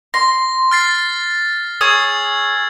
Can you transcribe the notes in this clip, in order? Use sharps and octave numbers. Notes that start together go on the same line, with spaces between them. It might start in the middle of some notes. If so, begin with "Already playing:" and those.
C6 A#6
F6 A6 C7
G#4 C#5 D#6 E6 G#6